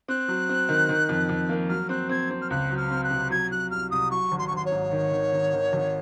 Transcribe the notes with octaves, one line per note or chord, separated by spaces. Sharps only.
C4 F#6
F#3
C4
D#3
D#3
F2
F2
A#3
F#3 F6
C4 F#6
C4 G#6
C4
F6
C#2 F#6
F#3
F6
C4
F#6
C3
F#3 G#6
F#3 F#6
C2 F6
C2 D#6
F#3 C#6
G#1
C6
C#6
G#1 C6
C#5
G#2
D#3
D#3
D#3
D#3
G#1